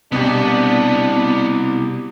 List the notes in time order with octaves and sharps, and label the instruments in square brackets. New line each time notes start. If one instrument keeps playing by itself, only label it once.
[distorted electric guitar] C2 [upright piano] B2 G4 [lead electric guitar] B3 [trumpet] D4